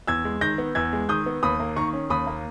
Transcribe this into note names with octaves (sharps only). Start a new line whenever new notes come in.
E2 E6 G#6
G#3
D#3 G6 A#6
B3
E2 E6 G#6
G#3
D#3 D#6 G6
B3
D#2 B5 D#6
A#3
D#3 A#5 C#6
C#4
D#2 B5 D#6
A#3